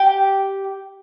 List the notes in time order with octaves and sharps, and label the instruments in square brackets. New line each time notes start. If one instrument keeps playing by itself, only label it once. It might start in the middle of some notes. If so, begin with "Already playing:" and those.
Already playing: [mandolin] G4